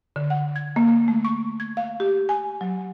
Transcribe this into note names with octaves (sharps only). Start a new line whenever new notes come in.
D3
F#5
G#6
A#3
A#3
A3
C#6
G#6
F5
G4
G#5
F#3